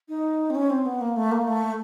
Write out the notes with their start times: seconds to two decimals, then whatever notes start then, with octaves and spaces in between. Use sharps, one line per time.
0.09 D#4
0.50 C4
0.55 C#4
0.70 C4
0.86 B3
1.01 A#3
1.16 A3
1.31 A#3
1.48 A3